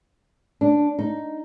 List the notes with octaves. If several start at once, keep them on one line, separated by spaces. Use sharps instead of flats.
D4
D#4